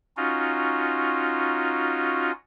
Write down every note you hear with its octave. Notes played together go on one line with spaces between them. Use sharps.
C#4 D#4 F4 F#4